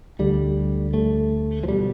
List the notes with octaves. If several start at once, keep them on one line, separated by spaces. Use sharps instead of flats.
D2 D3 G3
A3
F3
B2 G3